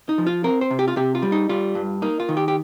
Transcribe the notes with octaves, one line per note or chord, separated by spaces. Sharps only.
D#4
F3
F4
C4 A#4
C5
C3
G4
F4
C3 G4
F4
G3
D#4
G3 F4
G2
A#3 D#4
F4
D#3
G4
G4